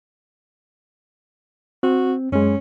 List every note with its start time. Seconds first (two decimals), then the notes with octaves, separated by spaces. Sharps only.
1.83 C4 F#4
2.32 F#2 G#3 C#4